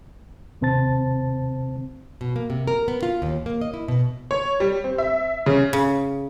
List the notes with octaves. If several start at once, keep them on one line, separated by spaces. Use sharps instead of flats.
D#2 C3 C4 C5 A5 A6
B2
A#3
C3
A#4
B3
F4
D#2
A#3
D#5
E4
B2
C#5
G3
C4
E5
C#3
C#3